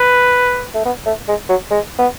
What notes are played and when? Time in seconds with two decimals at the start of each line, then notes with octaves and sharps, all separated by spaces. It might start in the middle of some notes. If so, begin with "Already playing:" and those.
Already playing: B4
0.74 A3
0.85 B3
1.06 A3
1.28 G#3
1.49 F#3
1.71 G#3
1.99 B3